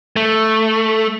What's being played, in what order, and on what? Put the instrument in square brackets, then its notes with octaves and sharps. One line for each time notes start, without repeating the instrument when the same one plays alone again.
[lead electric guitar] A3